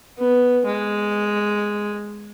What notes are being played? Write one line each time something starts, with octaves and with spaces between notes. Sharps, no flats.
B3
G#3